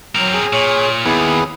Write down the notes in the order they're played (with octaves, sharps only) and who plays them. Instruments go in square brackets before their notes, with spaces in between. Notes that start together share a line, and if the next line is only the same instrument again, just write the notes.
[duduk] F#3 [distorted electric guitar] C4 A#4
[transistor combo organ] G#4
[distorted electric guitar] A#2 [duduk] C#5
[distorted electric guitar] D#2 [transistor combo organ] B3 G#4 [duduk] E4